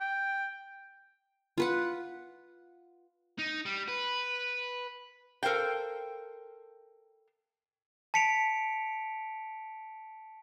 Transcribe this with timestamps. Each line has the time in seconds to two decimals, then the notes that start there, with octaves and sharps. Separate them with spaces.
0.01 G5
1.58 F4 B4 F#5
3.39 D#4
3.65 G3
3.88 B4
5.43 A4 A#4 C5 F5 G5
8.14 A5 B6 C#7 D7 F7